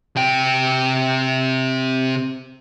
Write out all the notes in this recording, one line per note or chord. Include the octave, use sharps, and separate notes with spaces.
C3 G5